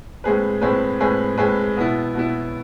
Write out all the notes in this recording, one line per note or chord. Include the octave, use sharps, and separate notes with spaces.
A2 G#3 C4 G#4 B4
A2 G#3 C4 G#4 B4
A2 G#3 C4 G#4 B4
A2 G#3 C4 G#4 B4
B2 B3 E4
B2 B3 E4